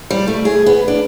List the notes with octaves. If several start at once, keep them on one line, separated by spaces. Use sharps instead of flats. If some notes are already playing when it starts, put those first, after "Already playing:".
G3
A3
G#4
B3
D4